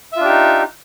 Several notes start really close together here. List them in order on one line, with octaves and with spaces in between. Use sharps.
E5 F4 D4 G4 D#4